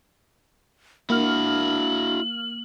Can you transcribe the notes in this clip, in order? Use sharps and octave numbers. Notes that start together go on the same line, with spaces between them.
A#3 D4 E4 F#4 F6 F#7